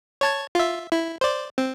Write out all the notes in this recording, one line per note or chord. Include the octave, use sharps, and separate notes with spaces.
C#5 A5 G#6
F4 E5
E4
C5 D5
C4